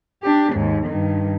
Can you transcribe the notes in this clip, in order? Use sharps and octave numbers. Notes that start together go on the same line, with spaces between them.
D4 G4
D#2 G#2
G2 D#3